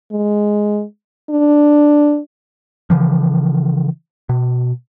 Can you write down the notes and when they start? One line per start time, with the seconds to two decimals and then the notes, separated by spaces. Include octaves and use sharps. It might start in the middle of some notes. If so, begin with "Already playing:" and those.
0.12 G#3
1.30 D4
2.90 C#3 E3 F3
4.29 B2